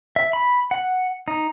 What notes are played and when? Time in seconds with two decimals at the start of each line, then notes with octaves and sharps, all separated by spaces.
0.16 E5
0.33 B5
0.71 F#5
1.28 D#4